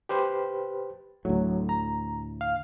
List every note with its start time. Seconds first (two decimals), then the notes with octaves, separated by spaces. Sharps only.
0.09 G4 B4 C5
1.25 D2 A2 F#3
1.69 A#5
2.41 F5